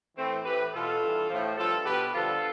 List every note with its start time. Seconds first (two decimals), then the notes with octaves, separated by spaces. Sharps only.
0.17 A2 E3 A3 C4
0.45 A2 E3 G4 B4
0.73 B2 F4 A4
1.01 G2 E3
1.30 A2 F3
1.57 G2 F3 F4 A4
1.86 B2 G4 B4
2.14 G2 D3 F3 F4 A4